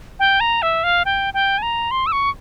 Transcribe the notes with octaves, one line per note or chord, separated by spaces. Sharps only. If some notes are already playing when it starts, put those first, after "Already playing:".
G5
A#5
E5
F5
G5
G5
G#5
A#5
C6
E6
C#6